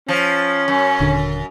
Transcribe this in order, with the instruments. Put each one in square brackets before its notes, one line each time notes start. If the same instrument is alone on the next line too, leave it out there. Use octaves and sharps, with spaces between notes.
[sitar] F3 [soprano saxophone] C#4
[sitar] F#2
[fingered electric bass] D#1 D3